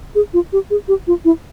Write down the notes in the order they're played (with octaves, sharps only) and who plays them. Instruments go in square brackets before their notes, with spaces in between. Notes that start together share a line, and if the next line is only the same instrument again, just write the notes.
[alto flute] G#4
F4
G4
G#4
G4
F4
E4